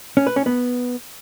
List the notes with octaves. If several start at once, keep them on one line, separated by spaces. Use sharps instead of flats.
C#4
B4
C#4
B3